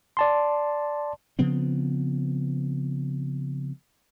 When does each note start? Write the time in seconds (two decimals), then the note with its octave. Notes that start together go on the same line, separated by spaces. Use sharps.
0.17 D5 A5 C6
1.39 C#3 F3 B3 C4